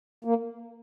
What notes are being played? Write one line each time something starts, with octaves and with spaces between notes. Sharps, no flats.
A#3